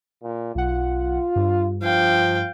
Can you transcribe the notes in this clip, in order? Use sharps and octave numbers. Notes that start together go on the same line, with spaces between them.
A#2
B1 F4 F#5
G2
F3 F5 G5